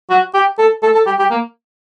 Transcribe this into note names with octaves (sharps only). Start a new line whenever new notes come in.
F#4
G4
A4
A4
A4
G4
G4
A#3